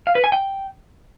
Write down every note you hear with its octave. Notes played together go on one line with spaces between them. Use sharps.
F5
B4
G#5
G5